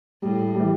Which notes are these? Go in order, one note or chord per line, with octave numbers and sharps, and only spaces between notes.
A2 G3
G3
E3